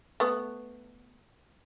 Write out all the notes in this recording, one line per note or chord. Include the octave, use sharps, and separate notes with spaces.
A3 B3